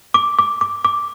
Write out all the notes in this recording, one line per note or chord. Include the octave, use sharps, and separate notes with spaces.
D6
D6
D6
D6